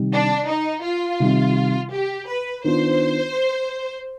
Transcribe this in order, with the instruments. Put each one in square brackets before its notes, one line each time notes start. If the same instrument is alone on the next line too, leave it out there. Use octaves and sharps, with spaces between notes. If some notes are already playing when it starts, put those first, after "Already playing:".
Already playing: [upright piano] C3 D#3 G3
[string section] D4
D#4
F4
[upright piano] C3 D#3 G3
[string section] G4
B4
[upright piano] D#3 B3 D4 F4 [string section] C5